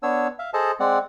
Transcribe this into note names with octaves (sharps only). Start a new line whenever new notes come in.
B3 D4 C#5 E6
E5 F5
G#4 A4 C5 D#5 A5
G#3 C4 D5 F#5